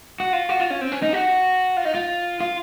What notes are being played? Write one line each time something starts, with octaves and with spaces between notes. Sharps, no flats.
F#4
F4
F#4
F4
C#4
C4
C#4
D#4
F#4
F4
D#4
F4
F4